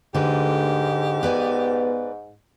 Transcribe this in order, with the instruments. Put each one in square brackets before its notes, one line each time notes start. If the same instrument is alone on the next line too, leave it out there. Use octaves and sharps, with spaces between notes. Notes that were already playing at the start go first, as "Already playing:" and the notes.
[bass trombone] D2 [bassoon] G#2 [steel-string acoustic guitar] D3 B4 [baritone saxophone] G4
[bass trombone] B3 [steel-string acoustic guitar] B4 D5 G#5